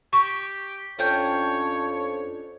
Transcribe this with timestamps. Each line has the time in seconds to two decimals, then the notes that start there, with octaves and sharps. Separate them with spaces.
0.13 G4 C#6
0.99 F2 C#4 D4 C#5 G5